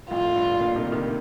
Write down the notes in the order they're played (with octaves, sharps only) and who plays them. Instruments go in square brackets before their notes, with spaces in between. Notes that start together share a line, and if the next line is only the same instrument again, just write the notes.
[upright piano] F2 A2 [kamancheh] F4
[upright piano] G2
A#2 D3
C3 D#3
C3 D#3